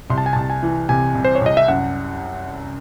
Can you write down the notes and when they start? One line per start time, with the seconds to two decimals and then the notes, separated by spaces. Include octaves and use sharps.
0.10 C2 C6
0.18 A5
0.26 G#5
0.33 C2 A5
0.50 G#5
0.63 E3
0.89 C3 G#5
1.15 C2
1.25 C5
1.35 C#5
1.41 C2 D#5
1.57 E5
1.68 F#2 F#5